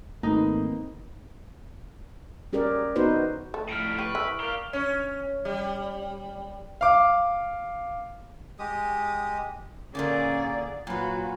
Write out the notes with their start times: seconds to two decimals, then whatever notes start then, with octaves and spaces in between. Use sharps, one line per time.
0.23 G#1 A3 A#3 C4 D#4 B4
2.53 C#4 G4 G#4 A#4 D5
2.96 B3 D#4 F#4 B4 C5
3.54 A3
3.69 F2 A2 G3 D#4 F6 D7
3.99 G4 B4 C#6
4.15 E3 E5
4.40 G4 A#4 D5 F5
4.73 C#4
5.45 G3
6.81 F5 D6
8.59 G#3 G4 D#6
9.95 A#2 D3 A#3 C#4 G#4 D5
10.87 A#2 F#3 F4 F#4 B4